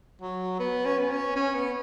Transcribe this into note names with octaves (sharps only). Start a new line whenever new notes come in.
F#3
B3
C#4
B3
C#4
C#4
B3